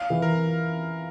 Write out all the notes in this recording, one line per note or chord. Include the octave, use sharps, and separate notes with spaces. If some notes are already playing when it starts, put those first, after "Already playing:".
Already playing: F5
E3
A#4